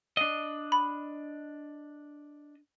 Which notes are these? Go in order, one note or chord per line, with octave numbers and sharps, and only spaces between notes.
D4 D#5
B5